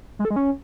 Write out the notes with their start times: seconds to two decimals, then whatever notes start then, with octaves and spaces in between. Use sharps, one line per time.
0.19 G#3
0.25 A4
0.31 G#3
0.36 C#4